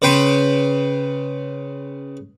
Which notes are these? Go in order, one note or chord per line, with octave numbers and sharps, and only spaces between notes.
C#3 B4 G5 C6